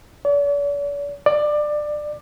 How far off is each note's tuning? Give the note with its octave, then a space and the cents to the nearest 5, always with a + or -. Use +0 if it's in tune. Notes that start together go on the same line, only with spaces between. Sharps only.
D5 -45
D5 +20